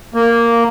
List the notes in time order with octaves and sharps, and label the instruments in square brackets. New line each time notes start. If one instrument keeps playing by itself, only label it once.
[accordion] A#3